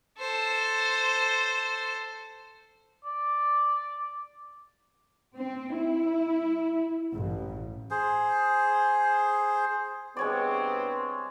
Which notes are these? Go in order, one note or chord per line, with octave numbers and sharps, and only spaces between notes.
A4 C5
D5
C4
E4
A1
G#4 C5
G2 G#3 B3 C4 C#5 D5